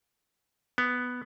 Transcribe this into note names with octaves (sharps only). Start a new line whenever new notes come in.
B3